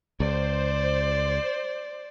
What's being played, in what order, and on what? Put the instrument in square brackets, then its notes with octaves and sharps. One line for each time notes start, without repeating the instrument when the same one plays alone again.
[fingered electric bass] C#2 [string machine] C5 [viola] D5